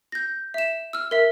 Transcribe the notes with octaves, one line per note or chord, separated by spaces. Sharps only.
G6 A#6
E5 E7
E6 F6
A#4 E5